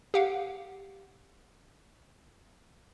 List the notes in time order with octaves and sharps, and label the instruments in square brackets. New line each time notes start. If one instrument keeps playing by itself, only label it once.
[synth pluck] G4 F5 F#5